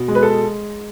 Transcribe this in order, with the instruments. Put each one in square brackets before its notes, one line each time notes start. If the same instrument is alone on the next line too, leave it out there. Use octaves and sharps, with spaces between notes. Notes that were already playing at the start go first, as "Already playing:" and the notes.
Already playing: [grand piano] B2
G#3
B4
A4